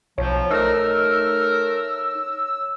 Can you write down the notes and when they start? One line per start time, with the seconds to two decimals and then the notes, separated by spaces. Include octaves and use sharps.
0.18 B1 F3 C#5
0.51 A3 D#4 A#4 E6